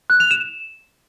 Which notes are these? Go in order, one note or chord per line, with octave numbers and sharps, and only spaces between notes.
F#6
F7
E7